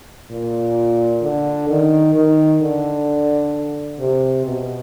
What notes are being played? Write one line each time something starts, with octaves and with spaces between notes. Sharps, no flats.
A#2
D3
D#3
D#3
D3
C3
B2